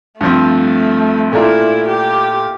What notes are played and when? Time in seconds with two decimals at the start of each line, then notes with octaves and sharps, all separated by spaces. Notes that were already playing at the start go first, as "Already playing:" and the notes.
0.21 G2 F3 A3 C4
1.32 A#2 A3 D4 E4 F4 A#4
1.88 G4